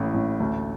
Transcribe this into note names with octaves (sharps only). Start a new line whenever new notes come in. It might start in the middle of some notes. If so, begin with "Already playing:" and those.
Already playing: A1 A2
A1
D2